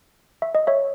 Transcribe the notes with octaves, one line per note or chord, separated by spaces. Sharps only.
E5
D#5
C#5 E5